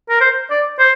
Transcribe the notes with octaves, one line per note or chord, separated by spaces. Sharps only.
A#4
C5
D5
C5